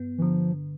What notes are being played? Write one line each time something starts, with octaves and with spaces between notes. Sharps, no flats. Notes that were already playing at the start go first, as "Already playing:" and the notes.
Already playing: G2 B3
E3
D3 F3